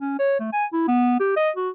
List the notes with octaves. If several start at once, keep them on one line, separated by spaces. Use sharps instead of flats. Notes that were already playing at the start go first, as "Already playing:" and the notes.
C#4
C#5
A3
G#5
E4
B3
G4
D#5
F#4